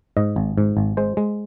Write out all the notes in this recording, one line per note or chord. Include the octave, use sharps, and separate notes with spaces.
G#2 D#5
G#1
G#2
G#1
G#3 C5
G#3